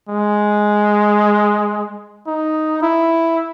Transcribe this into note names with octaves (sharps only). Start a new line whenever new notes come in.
G#3
D#4
E4